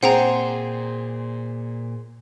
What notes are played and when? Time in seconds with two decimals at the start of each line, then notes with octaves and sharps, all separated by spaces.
0.03 A#2 C4 G#4 C5 F#5 G5 A#5